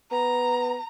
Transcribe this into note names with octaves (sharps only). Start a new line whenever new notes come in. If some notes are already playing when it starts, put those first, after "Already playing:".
B3 A#5